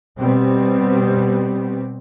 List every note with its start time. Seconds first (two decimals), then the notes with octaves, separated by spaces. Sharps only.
0.19 B2 G3 B3 C4